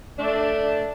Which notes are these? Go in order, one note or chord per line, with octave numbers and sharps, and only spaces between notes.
A3 D4